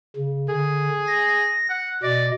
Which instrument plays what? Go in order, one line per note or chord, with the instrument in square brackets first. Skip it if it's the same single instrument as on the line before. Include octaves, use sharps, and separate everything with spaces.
[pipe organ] C#3
[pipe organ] D3 [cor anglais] G#4
[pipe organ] A#6
[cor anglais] F#5
[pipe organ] B2 D#5 [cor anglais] D5